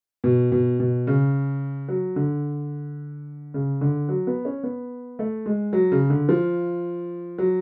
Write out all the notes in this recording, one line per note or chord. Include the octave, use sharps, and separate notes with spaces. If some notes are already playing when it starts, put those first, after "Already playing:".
B2
B2
B2
C#3
F#3
D3
C#3
D3
F#3
B3
C#4
B3
A3
G#3
F#3
C#3
D3
F3
F#3